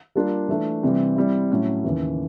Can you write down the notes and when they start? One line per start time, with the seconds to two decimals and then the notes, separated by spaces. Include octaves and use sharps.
0.15 G3 A#3 D4 F4
0.49 E3 A3 D4
0.83 C3 E3 G3 C4
1.16 G3 C4 E4
1.51 A2 F#3 A3 C#4 E4
1.84 D#2 C#3 E3